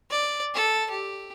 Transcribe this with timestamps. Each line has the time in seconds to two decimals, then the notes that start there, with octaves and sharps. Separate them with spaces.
0.10 D5
0.55 A4
0.90 G4